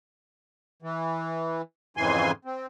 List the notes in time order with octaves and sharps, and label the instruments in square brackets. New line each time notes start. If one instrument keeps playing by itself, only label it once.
[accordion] E3
F2 G#2 C#3 E3 G#5 C6
C4